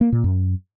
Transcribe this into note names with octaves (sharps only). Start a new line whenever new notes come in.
A#3
A#2
F#2